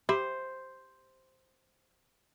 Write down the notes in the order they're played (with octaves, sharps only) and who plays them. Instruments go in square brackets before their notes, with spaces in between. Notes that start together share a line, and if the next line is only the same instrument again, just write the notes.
[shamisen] G4 E5 B5 [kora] C5